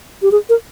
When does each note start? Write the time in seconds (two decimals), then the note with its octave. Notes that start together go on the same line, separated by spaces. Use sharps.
0.22 G4
0.32 G#4
0.49 A#4